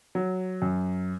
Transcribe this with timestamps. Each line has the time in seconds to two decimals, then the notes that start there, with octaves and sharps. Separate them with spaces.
0.15 F#3
0.62 F#2